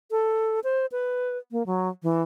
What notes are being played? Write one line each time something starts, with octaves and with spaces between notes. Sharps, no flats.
A4
C5
B4
A#3
F#3
E3